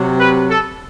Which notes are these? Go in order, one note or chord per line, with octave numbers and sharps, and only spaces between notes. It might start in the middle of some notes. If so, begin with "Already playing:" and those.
Already playing: C3 F#3
B4
A4